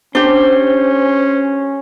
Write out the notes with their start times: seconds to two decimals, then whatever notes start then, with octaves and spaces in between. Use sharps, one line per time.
0.15 C#4 D4 G4 C5